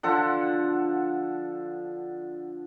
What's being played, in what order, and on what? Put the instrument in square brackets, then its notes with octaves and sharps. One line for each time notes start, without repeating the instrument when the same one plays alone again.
[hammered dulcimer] D3 F3 A4 F#5